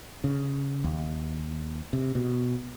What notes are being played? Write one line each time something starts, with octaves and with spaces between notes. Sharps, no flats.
C#3
D#2
C3
B2